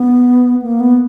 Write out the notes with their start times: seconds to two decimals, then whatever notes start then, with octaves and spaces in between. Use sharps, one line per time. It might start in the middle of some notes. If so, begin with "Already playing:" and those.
Already playing: B3
0.62 A#3
0.80 B3